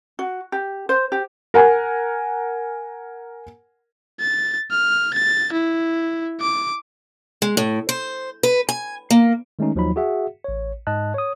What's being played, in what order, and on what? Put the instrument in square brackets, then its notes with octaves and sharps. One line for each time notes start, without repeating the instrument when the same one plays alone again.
[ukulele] F#4
G4
C5
G4
[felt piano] A#4 F#5 G#5
[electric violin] A6
F6
A6
E4
D6
[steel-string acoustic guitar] G#3
A2
C5
B4
G#5
A#3
[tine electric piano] D#3 G#3 A3 C#4 D#4
D#2 F3 F#3 D#4 B5
F#4 G#4 E5 F#5
A1 C#5
G#2 D#5 A5 F#6
C#5 D#6